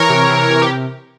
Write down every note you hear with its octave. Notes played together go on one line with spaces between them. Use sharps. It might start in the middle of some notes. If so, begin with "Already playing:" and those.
Already playing: E3 A#4 C#5
C3
E3
C3
G4